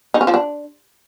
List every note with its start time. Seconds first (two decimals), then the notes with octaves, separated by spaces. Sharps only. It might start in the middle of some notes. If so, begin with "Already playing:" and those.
0.14 D#4
0.21 C#4
0.27 F3
0.34 D4